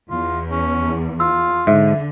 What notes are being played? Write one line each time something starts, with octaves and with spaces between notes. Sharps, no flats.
E2 F4
C#4
F4 E6
G#2 D3 E5